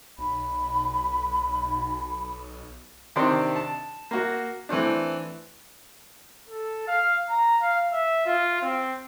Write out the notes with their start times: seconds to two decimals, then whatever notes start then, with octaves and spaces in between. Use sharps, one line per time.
0.19 B1 B5
3.16 C3 D#3 C4 D4 C6
3.56 A5
4.11 A#3 F#4
4.69 E3 A3 C4 D4
6.49 A4
6.88 F5
7.29 A#5
7.61 F5
7.92 E5
8.26 F4
8.62 C4